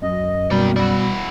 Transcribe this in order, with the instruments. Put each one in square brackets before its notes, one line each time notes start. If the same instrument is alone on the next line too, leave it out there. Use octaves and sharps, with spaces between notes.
[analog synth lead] F#2 [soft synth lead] D#5
[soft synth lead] B2 [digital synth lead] G3 [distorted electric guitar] A#3 G5
[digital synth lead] G3 [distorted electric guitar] E4 F#4